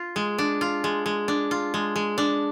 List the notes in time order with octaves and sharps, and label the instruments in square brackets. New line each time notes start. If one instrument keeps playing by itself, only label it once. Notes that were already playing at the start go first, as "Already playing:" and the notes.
Already playing: [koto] F4
G#3
D4
F4
G#3
G#3
D4
F4
G#3
G#3
D4